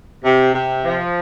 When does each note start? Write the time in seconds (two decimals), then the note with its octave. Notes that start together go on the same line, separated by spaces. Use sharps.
0.23 C3
0.54 C3
0.85 F3